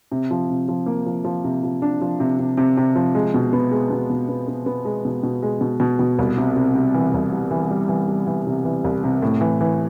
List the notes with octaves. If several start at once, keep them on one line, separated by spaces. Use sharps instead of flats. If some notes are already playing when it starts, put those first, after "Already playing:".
C3
F3
C3
F3
A#3
F3
F3
C3
F3
D4
F3
C3
C3
C3
C3
F3
G#3
B2
B3
G#3
B2
B2
B3
B3
B3
G#3
B2
B2
G#3
B2
B2
B2
C2
C3
C3
C3
E3
C2
G3
E3
G3
E3
G3
E3
C3
E3
C2
C3
A2
E3
E3